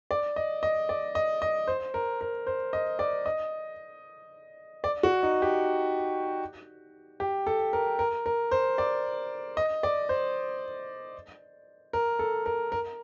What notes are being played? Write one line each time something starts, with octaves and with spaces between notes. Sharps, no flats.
D5
D#5
D#5
D5
D#5
D#5
C5
A#4
A#4
C5
D#5
D5
D#5
D5
F#4
D#4
G4
G4
A4
A#4
A#4
A#4
C5
D5
D#5
D5
C5
A#4
A4
A#4
A#4